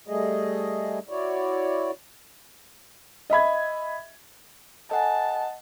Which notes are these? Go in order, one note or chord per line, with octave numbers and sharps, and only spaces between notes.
G3 A3 G#4 D#5
E4 F#4 C#5 D5
D#5 E5 B5 G#6
A4 D#5 F#5 G#5 A5